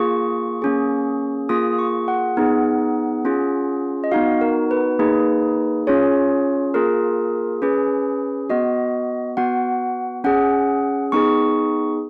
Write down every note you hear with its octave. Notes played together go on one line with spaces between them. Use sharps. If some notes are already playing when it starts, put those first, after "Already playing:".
Already playing: A#3 F4 G#4 C#6
A#3 C#4 G#4
A#3 F4 G#4 D#6
C#6
F#5
B3 D#4 G#4
C#4 F4 G#4
D#5
B3 D#4 F#4 F5
A#4
B4
A#3 D#4 G#4 B4
C#4 F4 G#4 C#5
A#3 F4 G#4 A#4
C#4 G#4 B4
B3 F#4 D#5
B3 F#4 F#5
C#4 G#4 F#5
B3 D#4 G#4 C#6